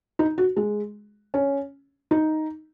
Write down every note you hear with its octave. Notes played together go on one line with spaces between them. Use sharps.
D#4
F#4
G#3
C#4
D#4